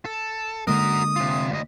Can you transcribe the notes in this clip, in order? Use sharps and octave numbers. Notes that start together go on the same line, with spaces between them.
A4
D3 G#3 A#3 F#4 A#4 D#6
C3 F4
D2 D#5